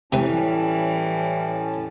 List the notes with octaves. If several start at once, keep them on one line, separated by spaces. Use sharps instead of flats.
A2 C3 E3 G3 C#4 B4 A5